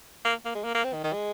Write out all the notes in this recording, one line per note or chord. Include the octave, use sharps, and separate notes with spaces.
A#3
A#3
G#3
A#3
A#3
C4
D#3
D#3
G#3